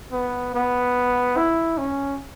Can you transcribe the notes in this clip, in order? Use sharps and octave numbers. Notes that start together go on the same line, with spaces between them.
B3
B3
E4
C#4